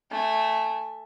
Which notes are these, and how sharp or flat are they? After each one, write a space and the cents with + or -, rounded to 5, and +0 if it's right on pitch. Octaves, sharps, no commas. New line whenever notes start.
A3 +0 G#5 -20